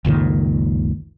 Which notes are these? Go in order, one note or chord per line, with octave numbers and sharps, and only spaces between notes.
F#1 C#2 A#2 D#3